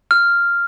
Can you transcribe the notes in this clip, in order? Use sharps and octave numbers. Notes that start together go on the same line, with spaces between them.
F6